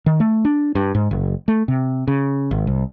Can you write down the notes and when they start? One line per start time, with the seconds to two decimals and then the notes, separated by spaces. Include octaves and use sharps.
0.06 D#3
0.20 A3
0.45 D4
0.75 G2
0.95 G#2
1.11 F#1
1.48 A3
1.68 C3
2.07 C#3
2.51 G#1
2.67 C2